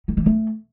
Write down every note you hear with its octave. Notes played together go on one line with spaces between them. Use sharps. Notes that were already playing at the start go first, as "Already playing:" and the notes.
D#3
E3
A3